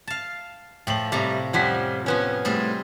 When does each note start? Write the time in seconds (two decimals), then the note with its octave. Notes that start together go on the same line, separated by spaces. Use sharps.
0.07 F5 A5
0.87 A2 F3 G5 F#7
1.12 A2 C3 G3 A#5
1.53 F2 F3 G3 C#4 F#5 B6
2.06 F3 B3 C#4
2.45 A2 G3 C4 G#4